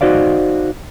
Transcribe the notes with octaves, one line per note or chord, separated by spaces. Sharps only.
D#4 F#4 C5 D5 F5